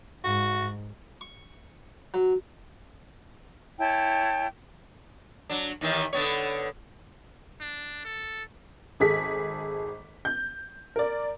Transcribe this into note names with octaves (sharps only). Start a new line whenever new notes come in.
G#2 F#4
C#6
F#3
E4 C#5 G5 A5
F#3 D4
D#2 D#3 E3
D3 B3 C#5
D4
A4
G#1 G#4 A4 B6
G6
A#4 D5